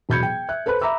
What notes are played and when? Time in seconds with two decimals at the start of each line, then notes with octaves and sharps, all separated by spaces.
0.09 E1 F#3 B5 G6 G#6 C#7
0.23 G5
0.49 E5 F#6
0.66 A4 B4 C5 B5 F#6
0.81 E5 A#5 B5 D6 E6